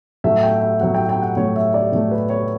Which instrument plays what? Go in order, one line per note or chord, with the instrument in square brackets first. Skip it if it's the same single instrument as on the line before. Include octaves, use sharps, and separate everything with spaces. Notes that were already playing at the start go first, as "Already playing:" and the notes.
[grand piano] A2 F#3 A3 E5
G5
E5
A2 F#3 A3 F#5
G5
G5
F#5
A2 F#3 A3 C#5
E5
D5
A2 F#3 A3
B4
C#5